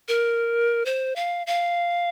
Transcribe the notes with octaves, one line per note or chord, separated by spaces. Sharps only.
A#4
C5
F5
F5